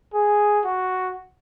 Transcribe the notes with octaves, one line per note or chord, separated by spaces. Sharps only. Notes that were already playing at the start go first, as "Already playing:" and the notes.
G#4
F#4